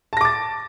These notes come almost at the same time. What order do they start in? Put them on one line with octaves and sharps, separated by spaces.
A5 A#6 D6 A6